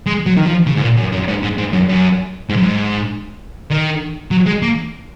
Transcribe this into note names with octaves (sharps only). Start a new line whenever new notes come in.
G#3
F#3
D#3
F3
C#3
G#2
A#2
F#2
F#2
G#2
G#2
G#2
F#2
F#2
G#2
F#2
G#2
D#3
F#3
G#3
A#3